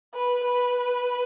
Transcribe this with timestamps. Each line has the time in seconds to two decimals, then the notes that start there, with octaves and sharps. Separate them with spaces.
0.15 B4
0.45 B4